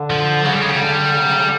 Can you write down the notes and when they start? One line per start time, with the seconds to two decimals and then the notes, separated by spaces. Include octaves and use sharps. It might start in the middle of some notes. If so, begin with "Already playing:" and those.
Already playing: D3
0.10 F3
0.44 C#3 F#3
0.53 G3
0.62 G#3
0.70 C#3 G3
0.79 D3
1.13 C#3
1.22 C3
1.31 C#3
1.38 D3